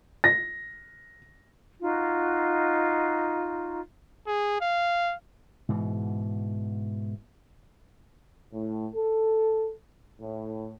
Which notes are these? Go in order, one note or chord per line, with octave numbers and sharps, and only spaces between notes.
A#6
D#4 F4 F#4
G#4
F5
G#2 B2 E3
A2
A4
A2